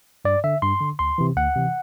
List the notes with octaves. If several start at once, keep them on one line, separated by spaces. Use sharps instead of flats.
G2 D5
D3 E5
G2 C6
D3
D2 C6
C3 E3
D2 F#5
C3 E3